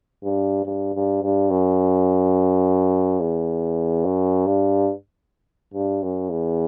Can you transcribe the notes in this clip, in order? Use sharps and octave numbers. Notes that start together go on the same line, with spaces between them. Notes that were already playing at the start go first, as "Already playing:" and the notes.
G2
G2
G2
G2
F#2
E2
F#2
G2
G2
F#2
E2